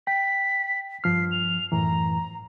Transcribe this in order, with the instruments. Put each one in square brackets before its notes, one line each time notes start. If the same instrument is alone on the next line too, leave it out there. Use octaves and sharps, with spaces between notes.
[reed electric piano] G5 [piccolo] B6
[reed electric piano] G2 F3 F6 [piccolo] C7
[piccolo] F7
[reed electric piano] F#2 A2 E3 [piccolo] A#5